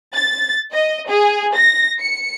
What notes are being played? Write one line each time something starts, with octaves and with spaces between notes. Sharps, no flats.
A6
D#5
G#4
A#6
C#7